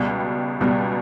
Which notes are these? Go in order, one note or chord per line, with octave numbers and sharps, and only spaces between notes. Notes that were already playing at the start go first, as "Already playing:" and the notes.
Already playing: C#2 B2 G3
C#2 B2 G3